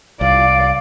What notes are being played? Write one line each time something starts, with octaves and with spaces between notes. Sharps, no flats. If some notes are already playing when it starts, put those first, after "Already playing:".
C2 D5 F5